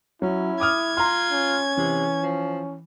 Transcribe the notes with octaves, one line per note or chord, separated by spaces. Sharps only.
F#3 C#4 E4
D6 D#6 F6 G#6
F4 A#5 C6
C#4
C3 E3
F3